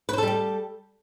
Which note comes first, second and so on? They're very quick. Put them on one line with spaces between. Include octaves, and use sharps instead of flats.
B4 C5 A4 G3 G4